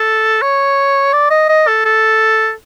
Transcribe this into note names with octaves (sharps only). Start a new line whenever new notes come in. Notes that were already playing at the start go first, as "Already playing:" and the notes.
Already playing: A4
C#5
D5
D#5
D#5
A4
A4